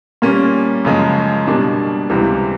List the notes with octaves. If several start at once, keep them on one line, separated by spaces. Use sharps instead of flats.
A#2 G3 A#3 C#4
F#2 C#3 F3 G#3
B2 G3 A#3 D4
C#2 C3 E3 G3